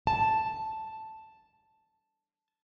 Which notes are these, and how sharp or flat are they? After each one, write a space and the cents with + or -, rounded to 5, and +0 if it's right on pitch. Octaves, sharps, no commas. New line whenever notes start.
A5 +0